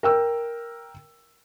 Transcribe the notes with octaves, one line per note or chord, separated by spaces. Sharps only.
A#4 G5 E6